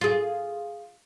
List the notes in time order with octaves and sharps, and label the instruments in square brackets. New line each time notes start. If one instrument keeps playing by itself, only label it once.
[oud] F4 G#4